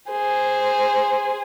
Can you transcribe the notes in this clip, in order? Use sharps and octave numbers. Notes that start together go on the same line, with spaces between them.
G#4 C5